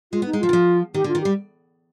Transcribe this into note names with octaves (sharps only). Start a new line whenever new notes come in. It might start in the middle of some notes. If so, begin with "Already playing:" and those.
G#3 F4
B3
D#4
G#3
F3 F4
D#3
F3
D#3 G4
D3
F4
D#3
G3 G4